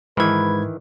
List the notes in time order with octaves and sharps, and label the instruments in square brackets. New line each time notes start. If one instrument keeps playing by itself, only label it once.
[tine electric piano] G#2 G#6 [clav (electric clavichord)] D#3 E3 [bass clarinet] B4